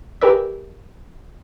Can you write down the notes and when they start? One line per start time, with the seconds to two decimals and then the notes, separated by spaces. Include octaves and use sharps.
0.21 G4 G#4 A#4 B4 D5 E5